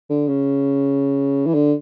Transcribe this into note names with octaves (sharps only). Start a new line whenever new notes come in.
D3
C#3
E3
D3